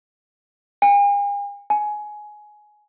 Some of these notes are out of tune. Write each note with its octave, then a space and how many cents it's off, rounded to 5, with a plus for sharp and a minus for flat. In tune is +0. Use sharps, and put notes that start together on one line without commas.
G#5 -45
G#5 +15